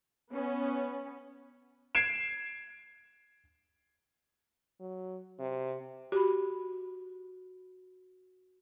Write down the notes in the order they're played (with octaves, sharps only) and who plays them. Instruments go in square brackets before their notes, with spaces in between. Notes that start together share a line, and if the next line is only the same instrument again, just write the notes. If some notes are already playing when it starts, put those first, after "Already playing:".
[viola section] B3 C#4
[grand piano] G#6 C7 D7 E7
[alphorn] F#3
C3
[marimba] F#4 B5 [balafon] G4